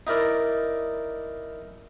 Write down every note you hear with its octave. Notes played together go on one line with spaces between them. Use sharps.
D#4 E4 A#4 D5